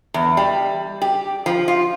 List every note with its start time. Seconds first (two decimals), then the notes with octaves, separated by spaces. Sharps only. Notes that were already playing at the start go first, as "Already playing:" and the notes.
0.14 E2
0.37 G3
1.02 G4
1.46 F3
1.68 F4